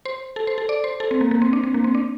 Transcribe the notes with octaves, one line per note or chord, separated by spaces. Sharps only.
C5
A4
C5
A4
D5
C5
A4
C4
A#3
A#3
C4
D4
C4
A#3
C4
D4